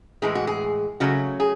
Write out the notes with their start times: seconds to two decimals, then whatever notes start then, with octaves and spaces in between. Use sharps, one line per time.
0.22 A2 E3 G#3 G#4
0.35 F#4
0.47 G#4
1.00 C#3 F#3 A3 F#4
1.40 G#4